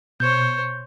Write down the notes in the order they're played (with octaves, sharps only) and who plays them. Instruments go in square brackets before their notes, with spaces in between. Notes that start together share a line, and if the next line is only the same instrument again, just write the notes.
[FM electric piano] B2 [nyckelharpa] C5 C#5 [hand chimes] G6